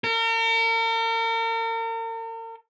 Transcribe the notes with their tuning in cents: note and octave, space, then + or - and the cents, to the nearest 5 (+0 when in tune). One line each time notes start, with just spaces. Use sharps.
A#4 -40